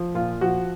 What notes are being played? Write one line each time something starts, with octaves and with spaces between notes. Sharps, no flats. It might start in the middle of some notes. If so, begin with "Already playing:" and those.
Already playing: F3
A#2 F4
F3 F#4